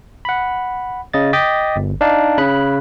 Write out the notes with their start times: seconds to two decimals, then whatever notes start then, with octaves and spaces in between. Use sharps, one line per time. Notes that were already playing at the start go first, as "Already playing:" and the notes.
0.25 F#5 B5
1.14 C#3 D#5 A6
1.33 D#5 G5 D6 A6 B6
1.76 G1
2.01 D4 D#4 F5 A5
2.38 C#3 B5 F#6